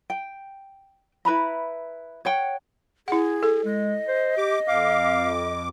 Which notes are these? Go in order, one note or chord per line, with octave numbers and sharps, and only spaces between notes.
G5
E4 B4 A#5 B5
C#5 F#5 G5
E4 G#4 F#5
A4
G#3 D#5
C5
G4 D6
F2 F5 D6